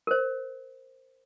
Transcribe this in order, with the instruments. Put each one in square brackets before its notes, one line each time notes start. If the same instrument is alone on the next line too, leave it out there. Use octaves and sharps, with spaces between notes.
[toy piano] A#4 C5